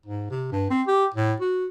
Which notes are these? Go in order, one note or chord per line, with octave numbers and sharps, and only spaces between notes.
G#2
C3
G2
C4
G4
A2
F#4